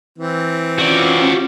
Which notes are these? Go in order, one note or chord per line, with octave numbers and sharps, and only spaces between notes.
E3 C4
C#4 F4 F#4 D5